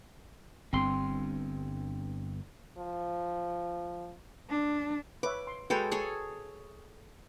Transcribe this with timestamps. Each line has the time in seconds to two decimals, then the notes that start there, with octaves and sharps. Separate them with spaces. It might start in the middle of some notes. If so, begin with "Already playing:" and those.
0.73 G1 G2 C4 C6
2.77 F3
4.50 D4
5.23 B4 C#5 E5 D6
5.47 C6
5.70 G#3 F#4 A4 B4 C#5 G5
5.91 G#4 A4 C#5